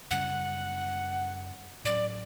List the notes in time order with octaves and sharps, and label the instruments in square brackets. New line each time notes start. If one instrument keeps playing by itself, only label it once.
[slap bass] F#2 C#3 G3 C#4 [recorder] F#5
[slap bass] A2 F#3 C#4 [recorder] D5